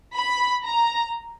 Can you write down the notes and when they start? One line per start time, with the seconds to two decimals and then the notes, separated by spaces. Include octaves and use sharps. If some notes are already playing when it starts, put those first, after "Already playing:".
0.14 B5
0.65 A#5